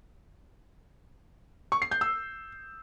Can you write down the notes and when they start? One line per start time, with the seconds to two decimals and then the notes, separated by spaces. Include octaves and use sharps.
1.72 C#6
1.82 C7
1.91 G6
2.01 E6